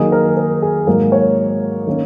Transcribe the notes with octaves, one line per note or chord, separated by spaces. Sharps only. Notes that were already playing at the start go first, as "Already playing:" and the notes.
Already playing: D#3 F#3 A#3 D#4 G#4
A#4
A#4
G#4
G#2 F#3 A#3 D#4 A#4
C#5
D#3 A#3 C#4